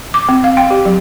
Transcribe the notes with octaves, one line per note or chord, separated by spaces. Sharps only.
D6
C4
F5
G5
G4
F#3